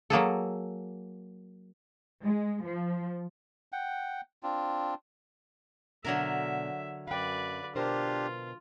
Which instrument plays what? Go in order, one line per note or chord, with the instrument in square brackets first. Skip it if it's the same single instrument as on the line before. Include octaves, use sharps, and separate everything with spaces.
[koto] F#3 A#3 G#4 A4
[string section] G#3
F3
[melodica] F#5 G5
C4 D4 F4
[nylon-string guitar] B2 D4 [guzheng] D3 F#3 A#4 [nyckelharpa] E5
[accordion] F#2 [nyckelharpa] B4 D5 [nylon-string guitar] F5 G5
[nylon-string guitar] B2 A#4 C5 [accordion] D4 G4 [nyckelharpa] F4